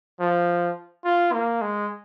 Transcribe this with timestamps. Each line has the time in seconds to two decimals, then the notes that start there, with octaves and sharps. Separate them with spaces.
0.20 F3
1.05 F4
1.33 A#3
1.62 G#3